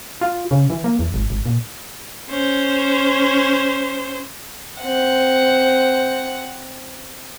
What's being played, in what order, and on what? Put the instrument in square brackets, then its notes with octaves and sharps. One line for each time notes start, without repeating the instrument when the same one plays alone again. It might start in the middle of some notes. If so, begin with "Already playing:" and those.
[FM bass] F4
C#3
E3
A#3
E2
G#1
G#1
A#2
[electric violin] C#4 C5
[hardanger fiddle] C4 F#5